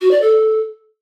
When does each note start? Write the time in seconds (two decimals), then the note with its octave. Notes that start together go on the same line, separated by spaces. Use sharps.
0.01 F#4
0.11 D5
0.21 A4